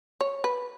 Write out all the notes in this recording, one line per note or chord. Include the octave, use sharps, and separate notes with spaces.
C#5
B4